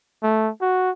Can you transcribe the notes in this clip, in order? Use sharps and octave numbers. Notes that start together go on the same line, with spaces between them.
A3
F#4